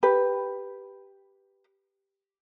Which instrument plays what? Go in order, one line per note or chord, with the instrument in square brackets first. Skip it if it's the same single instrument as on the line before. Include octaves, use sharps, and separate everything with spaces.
[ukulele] G4 B4